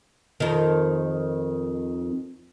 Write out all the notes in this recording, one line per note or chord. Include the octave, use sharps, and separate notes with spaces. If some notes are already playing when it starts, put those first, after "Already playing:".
F2 D#3